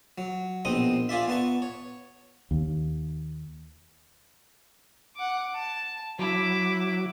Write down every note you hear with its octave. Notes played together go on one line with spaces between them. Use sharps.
F#3
A#1 B2 C4 D#5 D#6
F4 G#4 D5 E5
B3 A5 C#6
C#5
D#2
F#5 D6
A5
F#3 E4 D6